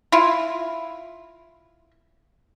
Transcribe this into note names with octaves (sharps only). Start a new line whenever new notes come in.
E4 F4